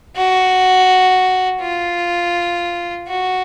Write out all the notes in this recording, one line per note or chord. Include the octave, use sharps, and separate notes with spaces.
F#4
F4
F#4